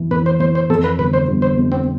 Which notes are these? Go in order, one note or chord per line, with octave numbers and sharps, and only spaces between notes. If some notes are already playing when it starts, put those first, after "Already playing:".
Already playing: F2 E3
E3 B4
C5
E3 C5
C5
F2 A4
B4
G1 B4
C5
G1
C5
F2
C4